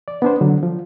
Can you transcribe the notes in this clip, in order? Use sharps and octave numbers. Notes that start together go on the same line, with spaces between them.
D5
B3 D4 C5
D3 F#3
F3